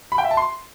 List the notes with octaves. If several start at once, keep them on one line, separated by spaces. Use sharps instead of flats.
B5
G5
E5
A5
C6